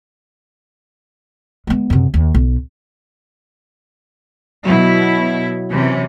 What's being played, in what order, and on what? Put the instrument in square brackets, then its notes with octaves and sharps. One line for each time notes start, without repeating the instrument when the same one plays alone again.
[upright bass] G#3 B3
F#2 C3
D#2
B1
[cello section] B2 E4 [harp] F#3
[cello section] C3 E3 C#4